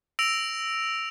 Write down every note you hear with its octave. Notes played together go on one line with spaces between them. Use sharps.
E6 A#6 D7 F7